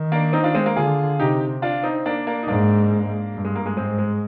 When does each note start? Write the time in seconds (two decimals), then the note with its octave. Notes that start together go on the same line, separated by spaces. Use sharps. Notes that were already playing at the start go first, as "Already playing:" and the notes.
Already playing: D#3
0.12 A#3 D4
0.33 C4 D#4
0.44 D4 F4
0.55 G#3 C4
0.66 A#3
0.76 D3 F4 G#4
1.20 C3 D#4 G4
1.62 D4 F4
1.83 C4 D#4
2.06 A#3 D4
2.27 A#3 D4
2.43 D#4
2.48 G#2 A#3 D4
3.34 G2
3.45 G#3
3.55 A#3
3.66 G#3
3.77 G#2 G#3 C4
3.98 G#3